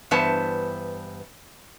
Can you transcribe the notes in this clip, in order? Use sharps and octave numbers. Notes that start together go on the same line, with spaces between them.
G2 E3 B3 B4 C5 A5